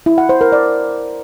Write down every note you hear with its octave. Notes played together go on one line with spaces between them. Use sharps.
E4
F#5
C5
A#4
D5